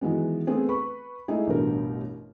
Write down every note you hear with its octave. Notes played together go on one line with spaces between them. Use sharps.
D#3 E3 F#3 G#3 B3
A3 B3 C4 G#4
B4 B5 C#6
G#3 A3 D#4 E4 G#4
A1 G2 B2 A#4